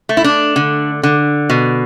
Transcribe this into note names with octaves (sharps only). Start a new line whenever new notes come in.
A3
E4
D4
D3
D3
B2